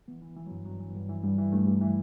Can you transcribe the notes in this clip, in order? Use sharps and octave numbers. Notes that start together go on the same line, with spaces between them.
E3 B3
E3
E3
G2 F#3
G2 F#3
E3
G2
E3
G2 G3
E3
G2 A3
G2
E3